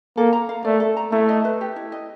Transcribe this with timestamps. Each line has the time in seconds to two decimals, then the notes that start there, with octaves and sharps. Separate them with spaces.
0.17 A#3 A4
0.33 A#5
0.49 F5
0.65 A3 D5
0.80 A4
0.97 A#5
1.12 A3 E4
1.29 D#5
1.45 B4
1.61 G4
1.76 E4
1.92 D#5